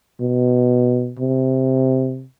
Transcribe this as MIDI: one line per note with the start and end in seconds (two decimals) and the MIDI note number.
0.20 1.14 47
1.19 2.25 48